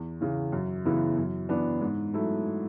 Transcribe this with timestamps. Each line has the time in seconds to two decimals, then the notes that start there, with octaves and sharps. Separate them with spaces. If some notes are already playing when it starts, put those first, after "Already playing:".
Already playing: E2
0.21 C#3 E3
0.52 F#2
0.85 C#3 E3 B3 E4
1.18 F#2
1.49 E3 B3 D4
1.81 G#2
2.13 F#3 A3 E4